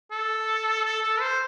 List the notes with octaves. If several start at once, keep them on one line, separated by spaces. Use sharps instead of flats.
A4
A4
A4
C5